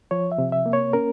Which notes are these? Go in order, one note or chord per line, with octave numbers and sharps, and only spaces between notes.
F3 C#5
E5
C3
E5
A#3
C#5
C#4 A#4